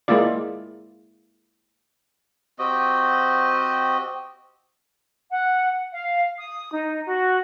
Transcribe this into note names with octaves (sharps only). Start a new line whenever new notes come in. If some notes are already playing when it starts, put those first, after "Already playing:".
G#3 A#3 E4 F4 D5
C4 F#4 G4 D#5
F#5
F5
D#6
D#4
F#4